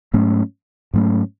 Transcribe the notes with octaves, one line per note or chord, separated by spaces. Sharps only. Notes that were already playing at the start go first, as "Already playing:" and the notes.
G#2 F#3 A3 C#4
G#2 F#3 A3 C#4